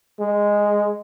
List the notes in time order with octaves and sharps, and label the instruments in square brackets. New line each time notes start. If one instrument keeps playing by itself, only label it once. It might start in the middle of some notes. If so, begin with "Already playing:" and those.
[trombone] G#3